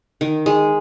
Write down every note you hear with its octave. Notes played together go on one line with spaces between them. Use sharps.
D#3
G#3